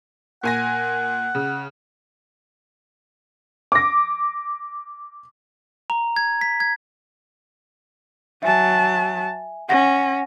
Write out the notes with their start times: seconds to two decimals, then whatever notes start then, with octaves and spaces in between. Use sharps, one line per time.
0.43 A#2 F#5 G#5 A#6
1.35 C#3
3.72 D6 A#6
5.90 A#5
6.16 G#6
6.41 B6
6.60 G#6
8.43 F#3 E5 G#5 A5
9.69 C#4 F#5 A#6